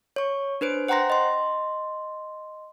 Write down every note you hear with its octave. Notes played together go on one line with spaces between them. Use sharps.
C#5 C#6
D4 B4 C5 D7
C5 F#5 G5 A#5 C6 A#6
D#5 C6